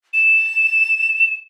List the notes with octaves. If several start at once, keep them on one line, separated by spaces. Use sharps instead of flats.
E7